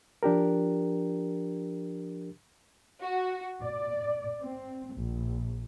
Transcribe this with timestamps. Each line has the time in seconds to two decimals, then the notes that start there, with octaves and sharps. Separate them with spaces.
0.23 F3 D4 G4 A#4
3.01 F#4
3.63 D5
4.41 C4
4.94 A#1